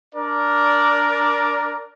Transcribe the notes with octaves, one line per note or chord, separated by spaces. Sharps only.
D4 A#4 D5